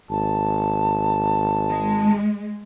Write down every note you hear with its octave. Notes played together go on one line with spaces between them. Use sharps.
G#1 A5
G#3